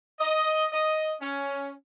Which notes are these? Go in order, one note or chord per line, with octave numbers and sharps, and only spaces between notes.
D#5
D#5
C#4